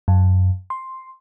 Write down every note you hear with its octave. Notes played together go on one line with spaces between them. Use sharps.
F#2
C6